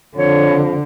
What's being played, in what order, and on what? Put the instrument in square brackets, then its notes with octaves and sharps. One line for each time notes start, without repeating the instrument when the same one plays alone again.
[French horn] F2 [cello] D3 [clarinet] C#5